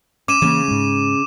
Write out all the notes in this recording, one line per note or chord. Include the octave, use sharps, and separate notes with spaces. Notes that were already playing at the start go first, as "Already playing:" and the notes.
C#4 D6 D#7 E7
C#3 E3 A#3 C#4
G#2 G#3